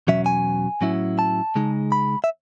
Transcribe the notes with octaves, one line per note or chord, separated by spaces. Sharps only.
E2 B2 F#3 C#4 E5
G#5
A2 F#3 C#4 E4
A5
C#3 G#3 D#4
B5
E5